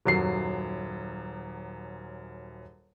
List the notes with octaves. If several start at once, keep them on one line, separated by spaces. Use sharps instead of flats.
D#1 F#2 C7